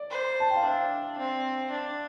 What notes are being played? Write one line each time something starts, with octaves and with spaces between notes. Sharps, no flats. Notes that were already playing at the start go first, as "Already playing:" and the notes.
Already playing: D5
C5
A5
G5
F5
D4 E5
C4
D4